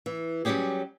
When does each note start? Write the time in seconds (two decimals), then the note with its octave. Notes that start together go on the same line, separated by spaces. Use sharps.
0.06 E3
0.45 F#3 G3 C4 C#4 G4 G#4